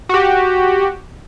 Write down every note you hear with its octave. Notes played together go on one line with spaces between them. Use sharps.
F#4 G4